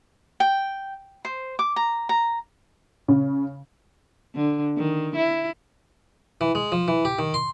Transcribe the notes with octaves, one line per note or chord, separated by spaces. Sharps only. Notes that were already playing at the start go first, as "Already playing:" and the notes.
G5
C5
D6
A#5
A#5
C#3
D3
D#3
E4
E3
G#3
F3
E3
G4
D#3
C6